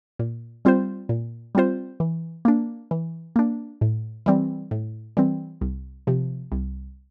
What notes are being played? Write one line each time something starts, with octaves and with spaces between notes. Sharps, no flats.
A#2
G3 C4 F4 C5
A#2
G3 C4 F4 C5
E3
A#3 D4
E3
A#3 D4
A2
E3 G3 C4
A2
E3 G3 C4
C2
C3 F3
C2